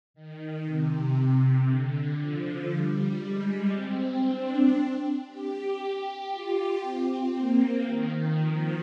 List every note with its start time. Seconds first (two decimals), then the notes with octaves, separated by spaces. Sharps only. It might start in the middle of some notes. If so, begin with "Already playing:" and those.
0.14 D#3
0.65 C3
1.67 D3
2.19 F3
2.70 G3
3.22 G#3
3.73 C4
4.24 D4
5.26 G4
6.29 F4
6.80 C4
7.31 A#3
7.82 D#3
8.33 F3